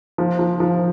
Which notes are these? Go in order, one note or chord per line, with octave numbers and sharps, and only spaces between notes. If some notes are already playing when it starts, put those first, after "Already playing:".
F3
F3
F3